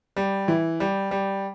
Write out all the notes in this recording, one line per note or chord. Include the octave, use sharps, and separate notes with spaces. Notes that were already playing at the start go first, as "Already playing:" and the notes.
G3
E3
G3
G3